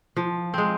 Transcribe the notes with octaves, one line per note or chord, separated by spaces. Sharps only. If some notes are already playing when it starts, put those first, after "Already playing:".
F3
G#3 C4